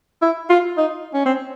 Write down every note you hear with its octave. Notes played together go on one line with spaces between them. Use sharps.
E4
F4
D#4
C#4
C4